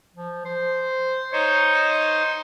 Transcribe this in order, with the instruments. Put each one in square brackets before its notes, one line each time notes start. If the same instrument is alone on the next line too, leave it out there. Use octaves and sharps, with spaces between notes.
[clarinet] F3
C5
[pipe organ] D#4 C5 [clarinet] C#5